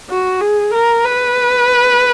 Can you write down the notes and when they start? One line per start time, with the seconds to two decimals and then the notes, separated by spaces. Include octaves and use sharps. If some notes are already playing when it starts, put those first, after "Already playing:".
0.10 F#4
0.41 G#4
0.74 A#4
1.05 B4